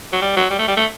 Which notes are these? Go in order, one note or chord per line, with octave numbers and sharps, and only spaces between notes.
F#3
G3
F#3
G3
A3
G3
A3